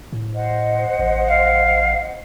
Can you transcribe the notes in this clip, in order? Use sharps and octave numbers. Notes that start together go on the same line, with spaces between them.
A2
C5 D#5 F#5
A1
F5